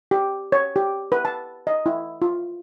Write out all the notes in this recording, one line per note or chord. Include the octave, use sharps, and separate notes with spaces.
G4
C#5
G4
B4
A5
D#5
E4
F4